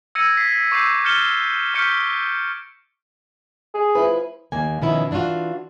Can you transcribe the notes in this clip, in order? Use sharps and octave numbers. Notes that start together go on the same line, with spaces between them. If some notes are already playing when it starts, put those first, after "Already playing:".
E6 G#6 A#6 C#7 D#7
B6 C7
C#6 D6 E6 G6 C7
F6 G6 A6 C#7 E7 G7
C#6 F6 G6 B6 C#7 D7
G#4
F3 E4 B4
D#2 A#3 G#5
B2 D#3 F3 B3 C#4 E4
E3 D4 D#4 F4 F#4